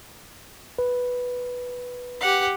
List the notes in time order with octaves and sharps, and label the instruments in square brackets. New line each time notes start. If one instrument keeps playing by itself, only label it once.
[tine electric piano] B4
[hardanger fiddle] G4 F#5